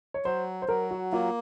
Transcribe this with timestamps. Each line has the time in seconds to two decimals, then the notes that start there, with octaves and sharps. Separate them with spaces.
0.14 C#5
0.25 F#3 C5
0.62 C5
0.69 F#3 A#4
0.91 F#4
1.12 A#3 F4